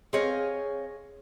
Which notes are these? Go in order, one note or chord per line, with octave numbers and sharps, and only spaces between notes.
C4 G#4 C#5 D#5 F5 G#5